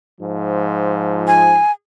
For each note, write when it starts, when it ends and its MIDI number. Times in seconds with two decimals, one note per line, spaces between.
0.21 1.61 44
0.21 1.61 53
1.28 1.72 80